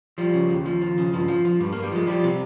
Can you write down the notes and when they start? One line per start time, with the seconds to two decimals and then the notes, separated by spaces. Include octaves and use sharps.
0.18 F3 G3
0.34 C#3
0.50 D#2
0.65 D#2 F3
0.82 F3
0.98 C#3
1.13 G2 F3
1.28 F3
1.45 F3
1.60 G2 G3
1.72 A#3
1.76 G2
1.83 G3
1.91 F3 G#3
2.07 F3 G3
2.24 C3